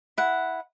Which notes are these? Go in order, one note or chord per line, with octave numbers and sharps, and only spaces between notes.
E4 F#5